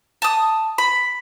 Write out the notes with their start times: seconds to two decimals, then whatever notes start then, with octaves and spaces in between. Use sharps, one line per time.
0.22 A5 D#6
0.78 B5